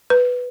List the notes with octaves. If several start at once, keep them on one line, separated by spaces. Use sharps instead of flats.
B4